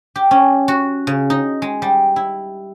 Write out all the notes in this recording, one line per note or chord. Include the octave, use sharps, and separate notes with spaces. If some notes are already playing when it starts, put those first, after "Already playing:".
G4
C#4
F#4
C#3
D#4
G#3
G3
E4